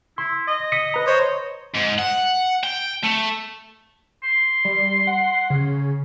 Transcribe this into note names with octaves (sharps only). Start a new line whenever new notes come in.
E4 C6
D#5
D#6 B6 C#7
B4 A#5
C5 C#5 D#5
G#2
F#5
G5
A3
C6
G3
F#5
C#3